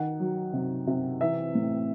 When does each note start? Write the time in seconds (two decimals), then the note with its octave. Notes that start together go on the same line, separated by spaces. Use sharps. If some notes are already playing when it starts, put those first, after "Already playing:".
Already playing: D#3 F#5
0.20 F#3
0.53 C3
0.87 C3
1.20 E3 E5
1.55 A2